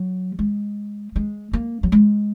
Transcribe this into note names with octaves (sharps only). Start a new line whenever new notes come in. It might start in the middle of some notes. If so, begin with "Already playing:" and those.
Already playing: F#3
G#3
G#3
A#3
F#3
G#3